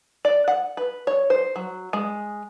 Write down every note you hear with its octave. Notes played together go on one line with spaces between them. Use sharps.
D5
F#5
B4
C#5
C5
F#3
G#3